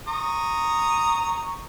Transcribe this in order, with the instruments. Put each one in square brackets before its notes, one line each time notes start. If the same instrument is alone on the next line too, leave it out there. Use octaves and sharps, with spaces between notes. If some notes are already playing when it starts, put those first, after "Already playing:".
[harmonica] A#5 C#6 D#6